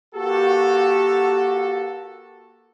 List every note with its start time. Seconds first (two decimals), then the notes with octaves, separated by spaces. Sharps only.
0.15 A#3 F#4 G4 A4